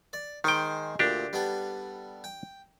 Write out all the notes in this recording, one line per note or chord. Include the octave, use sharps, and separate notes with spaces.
D5
D#3 G#3 C5 G5
D2 A#2 D4 G4
G3 B3 A4
G5